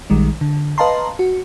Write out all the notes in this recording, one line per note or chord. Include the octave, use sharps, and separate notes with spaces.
A#1 D#3 G3 G#3
D3
B4 D#5 F5 A5 A#5 C6
F#4